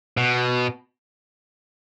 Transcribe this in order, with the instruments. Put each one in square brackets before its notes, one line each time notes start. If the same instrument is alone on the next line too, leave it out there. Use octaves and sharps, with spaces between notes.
[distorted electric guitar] B2